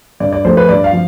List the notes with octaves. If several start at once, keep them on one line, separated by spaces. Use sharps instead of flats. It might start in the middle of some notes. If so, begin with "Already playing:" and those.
G2 D5
D5
F3 A3 C5
B4
G2 D5
F5
F3